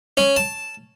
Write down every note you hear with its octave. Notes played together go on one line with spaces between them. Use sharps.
C#4
A5